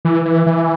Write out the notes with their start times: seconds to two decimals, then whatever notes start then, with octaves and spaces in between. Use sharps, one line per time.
0.05 E3
0.25 E3
0.46 E3